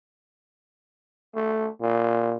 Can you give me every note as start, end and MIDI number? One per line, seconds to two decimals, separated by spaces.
1.35 1.69 57
1.81 2.37 46